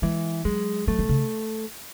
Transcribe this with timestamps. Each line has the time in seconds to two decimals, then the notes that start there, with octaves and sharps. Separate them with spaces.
0.02 E3 G#3
0.45 F#3 G#3
0.87 F#3 A3
0.99 D#3
1.09 C#3